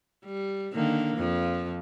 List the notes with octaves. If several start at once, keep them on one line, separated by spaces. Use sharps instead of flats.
G3
D3 D#3 A#3
F2 F3